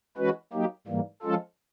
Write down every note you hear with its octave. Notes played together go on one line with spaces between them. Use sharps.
E3 G#3 C#4 F#4 B4
F#3 A#3 D#4 G4
G#2 E3 G3 A#3
F3 G#3 C#4 F4 A4